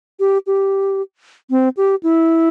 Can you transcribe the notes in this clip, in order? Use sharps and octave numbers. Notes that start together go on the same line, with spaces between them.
G4
G4
C4
G4
E4